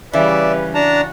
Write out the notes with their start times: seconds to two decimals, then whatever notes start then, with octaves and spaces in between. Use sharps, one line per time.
0.13 C#3 E3 G3 B4 D5 E5
0.74 D4 F#4 A5 A#5